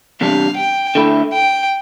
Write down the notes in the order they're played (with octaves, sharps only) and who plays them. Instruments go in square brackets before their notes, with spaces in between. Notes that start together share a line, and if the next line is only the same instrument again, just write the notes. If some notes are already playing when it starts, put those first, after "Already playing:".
[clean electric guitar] E2 C3 G3 D4 [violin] F5
[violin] G5
[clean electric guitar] D3 A3 E4
[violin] G5